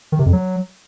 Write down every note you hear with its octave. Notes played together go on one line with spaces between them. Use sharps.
D#3
C3
F2
F#3